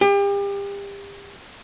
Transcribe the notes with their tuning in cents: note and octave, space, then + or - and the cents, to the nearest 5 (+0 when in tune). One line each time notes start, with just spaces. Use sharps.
G4 +35